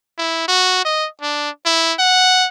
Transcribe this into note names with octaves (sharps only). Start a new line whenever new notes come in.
E4
F#4
D#5
D4
E4
F#5